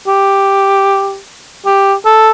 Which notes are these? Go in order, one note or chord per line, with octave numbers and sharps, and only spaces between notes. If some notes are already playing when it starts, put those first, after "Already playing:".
G4
G4
A4